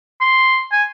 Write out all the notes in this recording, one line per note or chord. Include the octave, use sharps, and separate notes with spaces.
C6
G#5